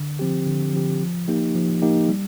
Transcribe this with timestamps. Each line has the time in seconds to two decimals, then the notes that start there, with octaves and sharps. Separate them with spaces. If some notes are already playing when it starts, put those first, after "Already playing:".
Already playing: D3
0.19 F3 C4 G4
0.46 D3
0.73 F3 C4 G4
1.00 F3
1.28 A#3 D#4 G4
1.55 F3
1.82 A#3 D#4 G4
2.09 G3